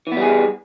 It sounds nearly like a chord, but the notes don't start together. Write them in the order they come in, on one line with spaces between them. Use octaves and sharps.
E3 B3 G3 G#4